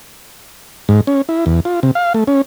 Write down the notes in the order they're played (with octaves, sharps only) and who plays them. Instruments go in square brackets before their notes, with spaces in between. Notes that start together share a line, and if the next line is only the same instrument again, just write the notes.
[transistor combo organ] G#2
C#4
E4
E2
F4
C3
F5
A3
C#4